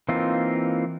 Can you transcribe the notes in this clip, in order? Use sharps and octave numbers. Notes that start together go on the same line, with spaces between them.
E3 A#3 C4 D#4 F4